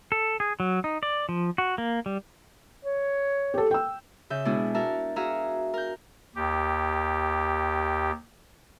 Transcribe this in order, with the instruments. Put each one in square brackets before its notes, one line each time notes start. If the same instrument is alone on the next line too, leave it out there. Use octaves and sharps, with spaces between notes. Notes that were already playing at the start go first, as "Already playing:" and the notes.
[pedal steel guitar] A4
G#4
F#3
D#4
D5
F3
F#4
A#3
G3
[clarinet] C#5
[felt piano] G4 A4
G5 E6
[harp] C#3 E5 G6
B2 G#3 B3 D4 E4 G#4
F#4 A#4 E5 A5
F#4 G#4 E5 F5 A#5
A#4 G6
[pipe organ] D#2 G4